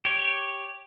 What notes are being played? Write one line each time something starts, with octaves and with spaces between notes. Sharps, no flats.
G4 C#5